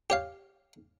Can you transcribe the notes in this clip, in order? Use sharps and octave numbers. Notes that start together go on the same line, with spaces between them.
G4 C#5 F5